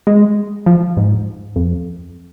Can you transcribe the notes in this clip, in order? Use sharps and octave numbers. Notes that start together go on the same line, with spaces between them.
G#3
F3
G#2
F2